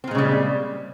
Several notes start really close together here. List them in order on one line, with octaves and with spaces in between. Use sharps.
C4 A#2 G#3 C#3 G3